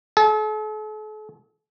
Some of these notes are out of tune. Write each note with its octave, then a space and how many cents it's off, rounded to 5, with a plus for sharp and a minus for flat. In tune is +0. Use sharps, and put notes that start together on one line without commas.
A4 -45